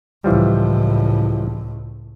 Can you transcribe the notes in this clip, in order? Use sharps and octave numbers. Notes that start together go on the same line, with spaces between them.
C#2 A2 E3 F3 G3